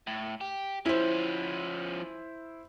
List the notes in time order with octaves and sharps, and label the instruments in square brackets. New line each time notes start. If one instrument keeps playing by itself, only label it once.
[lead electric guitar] A2
G4
[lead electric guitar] F3 C#4 [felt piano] E4 C5